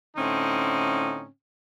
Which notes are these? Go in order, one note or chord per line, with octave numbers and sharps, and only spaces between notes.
A2 D3 C4 C#4 D#4